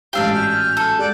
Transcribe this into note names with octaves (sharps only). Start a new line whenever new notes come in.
A1 G#2 D4 G4 E5 F5 G5
F#4 G#5 F6 G6
A4
G#3 D5 F#5 F#6 G6